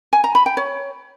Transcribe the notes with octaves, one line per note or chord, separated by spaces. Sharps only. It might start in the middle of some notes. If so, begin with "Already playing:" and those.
G#5
A#5
B5
G5
C#5